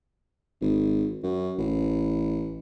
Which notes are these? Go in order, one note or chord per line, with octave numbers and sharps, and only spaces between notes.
G#1
F#2
A1